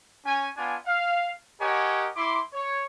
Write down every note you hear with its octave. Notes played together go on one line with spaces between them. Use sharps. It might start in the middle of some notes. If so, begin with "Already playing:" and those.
C#4 G#5
B3 D4 F4 G#5
F5
G4 A#4 C#5 D#5 F#5 G#5
E4 C6 D6
C#5